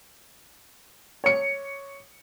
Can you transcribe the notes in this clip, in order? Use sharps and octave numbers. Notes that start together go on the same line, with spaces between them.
C#5 C#7